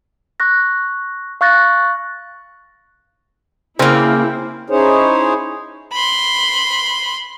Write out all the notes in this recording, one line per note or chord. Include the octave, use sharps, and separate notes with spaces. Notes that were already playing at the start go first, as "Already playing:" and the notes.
C#6 F#6 A#6
F5 C#6 F#6 A6 A#6
C#3 A#3 C4 E4
C#4 D#4 E4 G#4 C5 C#5
B5 C6